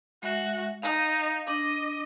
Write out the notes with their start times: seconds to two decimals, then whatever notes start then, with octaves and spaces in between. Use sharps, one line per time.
0.23 G#3 F#4 E5
0.82 D#4 F5
1.47 D4 D#5 D6